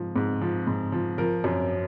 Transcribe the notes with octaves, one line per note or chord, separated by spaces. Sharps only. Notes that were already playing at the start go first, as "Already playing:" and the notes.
Already playing: G#2 F3
G#2
F3
G#2
F3
F3 A#4
F#2